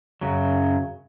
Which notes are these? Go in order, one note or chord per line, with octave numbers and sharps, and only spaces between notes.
F#2 C#3 F#3